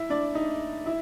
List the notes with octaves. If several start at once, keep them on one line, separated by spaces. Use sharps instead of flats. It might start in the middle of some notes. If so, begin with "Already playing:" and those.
Already playing: E4 E5
D4 D5
D#4 D#5
E4 E5